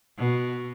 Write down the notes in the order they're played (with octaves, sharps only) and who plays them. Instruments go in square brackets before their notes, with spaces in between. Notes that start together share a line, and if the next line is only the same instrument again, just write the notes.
[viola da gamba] B2